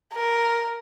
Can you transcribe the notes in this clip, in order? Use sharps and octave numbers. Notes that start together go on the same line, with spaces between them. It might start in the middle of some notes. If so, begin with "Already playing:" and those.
A#4